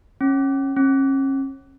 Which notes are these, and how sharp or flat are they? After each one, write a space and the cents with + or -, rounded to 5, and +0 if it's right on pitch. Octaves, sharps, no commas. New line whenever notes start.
C#4 -20
C#4 -35